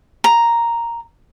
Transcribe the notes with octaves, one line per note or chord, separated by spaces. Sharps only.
A#5